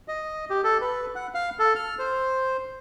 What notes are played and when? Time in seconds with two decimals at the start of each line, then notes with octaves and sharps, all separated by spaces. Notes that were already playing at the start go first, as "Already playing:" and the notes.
0.08 D#5
0.50 G4
0.64 A4
0.81 B4
1.15 F#5
1.34 F5
1.59 A4
1.76 F6
1.99 C5